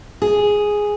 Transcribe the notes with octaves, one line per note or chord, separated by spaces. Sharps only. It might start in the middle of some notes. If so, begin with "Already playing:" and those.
G#4